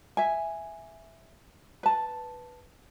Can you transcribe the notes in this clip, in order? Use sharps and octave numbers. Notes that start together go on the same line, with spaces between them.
E5 G#5
B4 A5